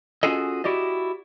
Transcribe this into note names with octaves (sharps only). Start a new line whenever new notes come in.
C#4 F4 F#4 G#4 A4 D#5
E4 F#4 G4 D5 D#5